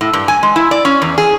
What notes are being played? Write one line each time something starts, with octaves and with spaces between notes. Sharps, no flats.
A2
G2
G#5
G#3
E4
D5
C#4
E2
G#4